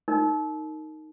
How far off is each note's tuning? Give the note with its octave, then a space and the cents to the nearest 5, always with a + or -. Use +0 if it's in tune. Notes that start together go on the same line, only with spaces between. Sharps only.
D#4 +0 A#4 -20